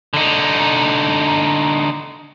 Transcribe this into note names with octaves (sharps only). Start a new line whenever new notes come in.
D3 D#4